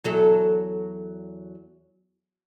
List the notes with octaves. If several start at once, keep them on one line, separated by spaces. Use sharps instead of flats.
E2 F#3 A4